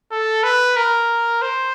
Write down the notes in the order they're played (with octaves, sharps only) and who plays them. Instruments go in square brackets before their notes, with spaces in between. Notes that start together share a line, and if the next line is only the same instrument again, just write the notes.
[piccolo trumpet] A4
B4
A#4
C5